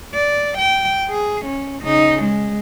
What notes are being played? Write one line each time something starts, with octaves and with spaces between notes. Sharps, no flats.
D5
G5
G#4
C#4
C#3 D#4
G#3